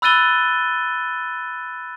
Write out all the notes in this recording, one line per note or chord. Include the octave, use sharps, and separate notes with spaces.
B5 E6 F#6 A6 D#7 G7